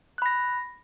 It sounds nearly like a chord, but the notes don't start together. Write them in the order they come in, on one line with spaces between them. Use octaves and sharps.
F#6 B5 A#6